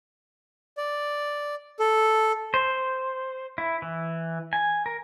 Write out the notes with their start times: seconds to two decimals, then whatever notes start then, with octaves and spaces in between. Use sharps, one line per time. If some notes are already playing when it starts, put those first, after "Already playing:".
0.77 D5
1.79 A4
2.54 C5
3.58 E4
3.82 E3
4.53 G#5
4.86 A#4